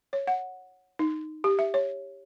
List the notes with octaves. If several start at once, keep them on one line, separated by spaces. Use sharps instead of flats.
C#5
F#5
D#4
G4
E5
C#5